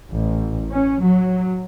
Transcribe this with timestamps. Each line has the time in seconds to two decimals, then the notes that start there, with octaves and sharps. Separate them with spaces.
0.12 A1
0.72 C#4
1.03 F#3